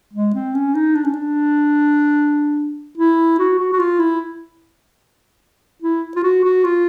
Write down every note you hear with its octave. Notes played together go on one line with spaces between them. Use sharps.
G#3
C4
C#4
D#4
D4
C#4
D4
E4
F#4
F#4
F#4
F4
E4
E4
F4
F#4
F#4
F4